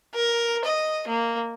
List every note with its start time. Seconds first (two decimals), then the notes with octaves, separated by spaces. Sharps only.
0.14 A#4
0.65 D#5
1.07 A#3